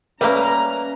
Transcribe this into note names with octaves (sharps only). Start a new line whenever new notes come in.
G3 A3 A#3 C#4 B4 A#5